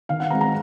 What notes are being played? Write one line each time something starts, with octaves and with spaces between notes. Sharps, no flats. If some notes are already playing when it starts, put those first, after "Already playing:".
D#3 F5
F#5
G#3 C4 A#5
A#5